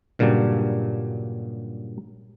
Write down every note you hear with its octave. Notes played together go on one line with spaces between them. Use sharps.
G2 A#2 C#3 F#3 G3 D4